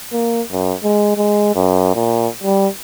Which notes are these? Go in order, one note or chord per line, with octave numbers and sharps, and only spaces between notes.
A#3
F#2
G#3
G#3
F#2
A#2
G3